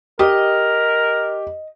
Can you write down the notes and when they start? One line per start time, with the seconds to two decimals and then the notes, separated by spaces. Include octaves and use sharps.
0.19 G4 A#4 D#5